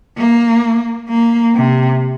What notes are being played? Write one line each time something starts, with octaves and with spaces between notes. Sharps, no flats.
A#3
A#3
C3